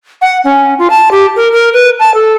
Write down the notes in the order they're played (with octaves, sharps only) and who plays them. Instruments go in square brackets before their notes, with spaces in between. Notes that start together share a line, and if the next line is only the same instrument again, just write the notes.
[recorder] F#5
C#4
F4
A5
G4
A#4
A#4
B4
A5
A4